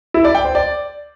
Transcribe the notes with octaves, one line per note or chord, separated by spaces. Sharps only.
E4
D5
G5
C5
D5